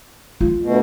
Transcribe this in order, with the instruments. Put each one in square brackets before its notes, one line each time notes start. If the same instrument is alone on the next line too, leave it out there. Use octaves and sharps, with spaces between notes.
[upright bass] F4
[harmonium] D2 B2